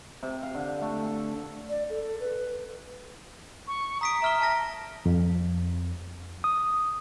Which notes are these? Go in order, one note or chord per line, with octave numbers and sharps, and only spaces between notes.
C3
F5
D3
A3
A4
D5
A4
B4
C#6
A#5 D#6 B6 D7
E5 A#5 F6 G7
A5 A#6 B6
F2
D#6